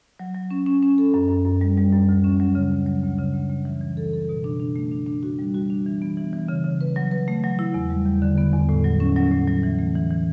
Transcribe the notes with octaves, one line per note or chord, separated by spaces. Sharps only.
F#3
F#3
C#4
C#4
C#4
A4
F#2
F#2
F#2
G3
G3
F#2
D2
C#4
F#3
C#3
D2
F#3
D2
C#3
D2
D2
E3
E3
A4
A4
B2
D4
D4
A3
D4
D4
F#4
G3
F#4
D4
E3
B3
E3
E3
C#3
C#3
B4
F#3
B4
A3
F#3
E4
E2
G3
E2
D3
B3
E2
A2
F#3
C#4
F#3
A2
F#3
E3
A3
E3
E3